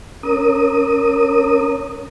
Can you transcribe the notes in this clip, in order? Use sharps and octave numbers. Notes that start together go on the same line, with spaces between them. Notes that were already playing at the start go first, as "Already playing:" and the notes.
C#4 A#4 D#6